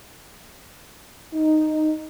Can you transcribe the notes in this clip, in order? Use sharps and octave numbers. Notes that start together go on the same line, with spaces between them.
D#4